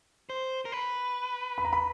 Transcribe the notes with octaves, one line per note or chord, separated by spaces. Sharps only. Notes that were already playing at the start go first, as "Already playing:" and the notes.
C5
A#4
B4
B5
A#5
B5